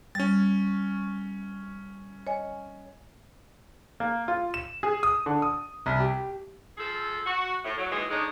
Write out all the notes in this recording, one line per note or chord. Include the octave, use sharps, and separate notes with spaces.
G3 C#4 A6
C#5 D#5 G#5
A#3
F4
E7
G#4
D#6
D3
D#6
C2
G4
F3 G#4 A4
F#4
A2
F#3
D#2 E3 G#3
D3 G#3 C#4 D#4